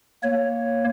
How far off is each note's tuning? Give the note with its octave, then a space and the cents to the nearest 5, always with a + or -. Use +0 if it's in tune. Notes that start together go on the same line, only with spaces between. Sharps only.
A#3 +0 C#5 +0